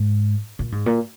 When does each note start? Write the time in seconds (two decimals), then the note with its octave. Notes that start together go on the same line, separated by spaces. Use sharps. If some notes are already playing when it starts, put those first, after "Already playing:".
Already playing: G#2
0.59 A#2
0.72 G#2
0.86 A#2